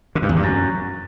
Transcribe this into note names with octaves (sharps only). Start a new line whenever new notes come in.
D3
G2
E2
G2
F#2